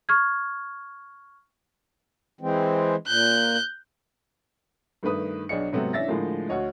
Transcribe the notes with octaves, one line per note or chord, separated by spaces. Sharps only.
C#6 F6 G#6
E3 G#3 C4
A#2 F#6 G6
G2 D#3 A3 B4 D#6
B1 D4 G#4 C#5 D#5 C#7
G#2 C3 F#3 A3 B3 C4
E3 C#4 D4 E5 A6 A#6
A2 D3 F3 G#3 A#3
D2 F#4 C#5 D#5